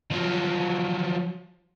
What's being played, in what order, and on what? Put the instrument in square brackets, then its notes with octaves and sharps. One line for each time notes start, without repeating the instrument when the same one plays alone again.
[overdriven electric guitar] F3 F#3